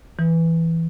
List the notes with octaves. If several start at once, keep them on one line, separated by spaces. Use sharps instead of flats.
E3